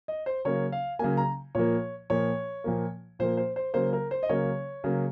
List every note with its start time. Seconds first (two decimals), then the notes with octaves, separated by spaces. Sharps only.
0.08 D#5
0.26 C5
0.45 C#3 F#3 A#3 C#5
0.72 F5
0.99 C#3 F#3 A#3 G#5
1.17 A#5
1.55 A#2 F3 A#3 C#5
2.10 A#2 F3 A#3 C#5
2.64 A#2 F3 A#3
3.19 A#2 F3 A#3 C5
3.37 C5
3.56 C5
3.74 C#3 F#3 A#3 C5
3.93 A#4
4.11 C5
4.23 D#5
4.29 C#3 F#3 A#3 C#5
4.84 C#3 F#3 A#3